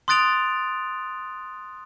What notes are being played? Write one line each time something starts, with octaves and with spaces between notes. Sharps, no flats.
C6 D#6 F#6 A6 D7 F7